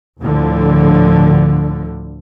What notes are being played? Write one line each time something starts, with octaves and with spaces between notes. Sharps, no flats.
D2 A2 D3 F3